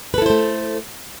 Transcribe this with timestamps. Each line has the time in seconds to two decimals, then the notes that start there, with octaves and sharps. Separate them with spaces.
0.14 B4
0.18 A4
0.22 E4
0.26 C5
0.30 A3